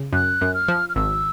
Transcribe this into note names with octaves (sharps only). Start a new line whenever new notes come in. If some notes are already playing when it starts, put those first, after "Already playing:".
Already playing: C#3
F#2 F#6
F#2
F6
F3
F6
G#1 E6